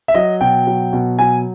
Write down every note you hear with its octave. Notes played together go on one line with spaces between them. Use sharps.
E5
F#3 D#5
B2 G5
F#3
B2
F#3 G#5